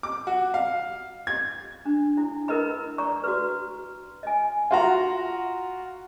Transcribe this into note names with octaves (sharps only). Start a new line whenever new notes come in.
D6
F#4
F5
G#6
D4
E4
E4 A#4 B4 D#5 B5
D5 A#5 C#6
F#4 B4
D#5 G#5
F4 F#4 A#5